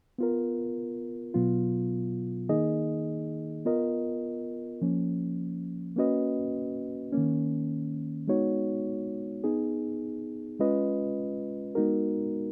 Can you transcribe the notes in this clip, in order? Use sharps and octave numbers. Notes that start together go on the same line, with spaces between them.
B3 F4 A#4
B2 F#3 B3 F4
D#3 A#3 D#4 G#4 D#5
B3 F4 A#4 D#5
F3 A#3 C#4
A#3 C#4 F#4 B4 D#5
D#3 A#3 C#4
G#3 B3 D#4 F#4 C#5
B3 D#4 G#4
G#3 C#4 F4 B4 D#5
G#3 B3 D#4 F#4 A#4